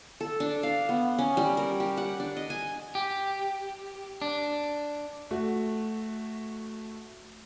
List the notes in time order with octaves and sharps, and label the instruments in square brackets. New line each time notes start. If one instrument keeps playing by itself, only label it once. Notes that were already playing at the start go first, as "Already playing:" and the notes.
[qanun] A4
D4
F5
B3
C#4
G3
A#4
G4
F#5
D4
D#5
G#5
[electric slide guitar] G4
D4
[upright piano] A3 F#4